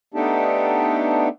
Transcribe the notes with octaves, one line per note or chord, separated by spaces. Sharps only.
A3 B3 D4 D#4 G4 A4